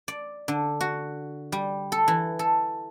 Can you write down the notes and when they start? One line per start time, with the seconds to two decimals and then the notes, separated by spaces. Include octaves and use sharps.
0.08 D5
0.48 D3
0.81 F#4
1.52 G3
1.92 A4
2.08 E3
2.39 A4